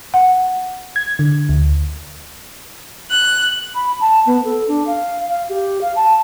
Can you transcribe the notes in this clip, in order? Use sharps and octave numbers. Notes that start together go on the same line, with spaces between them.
F#5
G#6
D3
D2
F#6
B5
A5
B3
A4
D4
F5
F5
G4
F5
A5